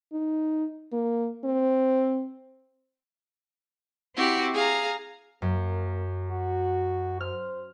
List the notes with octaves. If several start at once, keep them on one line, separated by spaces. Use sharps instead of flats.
D#4
A#3
C4
C4 E4 F#4 G4
G#4 F5 A#5
F#2 A#3
F#4
C5 F6